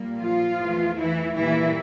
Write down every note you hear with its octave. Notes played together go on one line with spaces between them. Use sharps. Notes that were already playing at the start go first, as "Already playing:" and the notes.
Already playing: A#2 G3 A#3
F3 F4
E2 E3 A3
E3 E4
A#2 E3 G3 A#3 E4